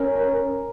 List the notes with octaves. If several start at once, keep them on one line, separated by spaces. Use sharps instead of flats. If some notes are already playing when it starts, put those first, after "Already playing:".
Already playing: C#4 A#4
A#4
A#4